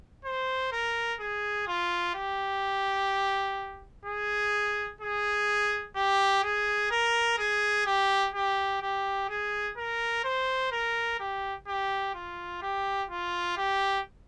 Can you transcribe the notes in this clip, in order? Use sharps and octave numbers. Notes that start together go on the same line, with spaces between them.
C5
A#4
G#4
F4
G4
G#4
G#4
G4
G#4
A#4
G#4
G4
G4
G4
G#4
A#4
C5
A#4
G4
G4
F4
G4
F4
G4